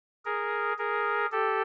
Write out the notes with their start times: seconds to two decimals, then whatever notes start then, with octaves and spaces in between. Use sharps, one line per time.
0.25 G#4 A#4
0.78 G#4 A#4
1.32 G4 A4